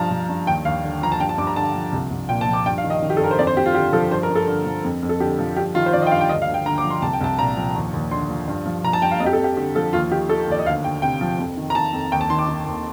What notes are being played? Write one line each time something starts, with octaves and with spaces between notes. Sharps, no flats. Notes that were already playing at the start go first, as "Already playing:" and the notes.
Already playing: G2 F3 A5 A#5
F3
G2
D#2 G5
D#2 F5
D3
F3 A#5
A5
G2 G5
A5
G2 D6
A#5
D3 A5
F3
C2
C2
A#2 G5
A5
F3
D6
G2 G5
F5
D#3
D#5
D#3
G4
A4
G2 A#4
C5
F2 D5
C5
F2 G4
F4
D3 G4
F3 A4
G2 C5
A#4
G2
A4
D3
F3
F2
F2
A4
D3 G4
F3
G2 G4
D#3 F4
C5
D#3 D5
D#5
G5
G2 F5
G5
D2 D#5
F5
D2
G5
D3 A#5
D6
F3
C6
C2 A5
G5
C2 A5
A#2 A#5
F3
D#2
D#2
D3 C6
F3
G2
F3
F3 A#5
A5
G2 G5
F5
F2 D#5
G4
A4
F2
G4
D3 G4
F3 A4
D#2 F4
D#3 G4
D#3 A4
D#2 D5
D#5
D2 F5
D2 G5
C3 G5
F3
F2
D#3
A#5
D#3 A5
F2
D#2 G5
A5
D#3 C6
D6
D#3
D#2